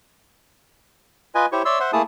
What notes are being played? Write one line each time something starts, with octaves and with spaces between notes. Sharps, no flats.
F4 B4 D#5 G#5
E4 G4 C5 C#5 C#6
C#5 D5 E5 C6 E6
C5 E5 F#5 C6
A3 A#3 E4 G#4 A5 D#6